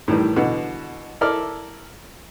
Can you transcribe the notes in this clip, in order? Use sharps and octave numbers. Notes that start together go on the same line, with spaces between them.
A2 D#3 E3 G3
B2 D3 E3
E4 A4 A#4 D5 F6